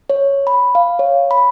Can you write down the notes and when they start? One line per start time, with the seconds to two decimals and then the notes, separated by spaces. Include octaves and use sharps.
0.10 C#5
0.47 B5
0.75 F5
0.99 C#5
1.31 B5